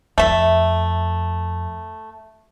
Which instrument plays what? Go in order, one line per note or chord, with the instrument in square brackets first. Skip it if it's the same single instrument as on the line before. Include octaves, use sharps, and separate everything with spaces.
[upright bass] F2 [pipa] A3 E5